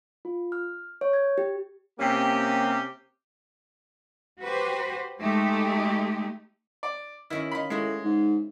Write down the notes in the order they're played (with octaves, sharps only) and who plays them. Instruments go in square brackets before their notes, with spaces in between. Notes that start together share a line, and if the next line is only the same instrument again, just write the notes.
[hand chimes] F4
F6
C#5
G#6
G4
[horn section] C3 A#3 C#4 G4
[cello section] F#4 G4 B4 C5
G#3 A3 D#4 G4
[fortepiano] D5
[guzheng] D#3 C#4 F#4 [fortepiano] E4
[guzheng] D#4 F4 [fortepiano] B5
[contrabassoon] A2 [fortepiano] G#3 [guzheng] E4 F#4
[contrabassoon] G#2